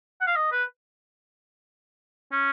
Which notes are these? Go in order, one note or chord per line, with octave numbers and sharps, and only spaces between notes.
F#5
F5
D#5
B4
C#4